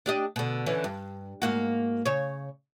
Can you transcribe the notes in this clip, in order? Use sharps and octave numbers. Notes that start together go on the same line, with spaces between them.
D4 G4 D#5
B2 D3
D3 E3 C#4
G2
G#2 A#3 F#4
C#3 C#5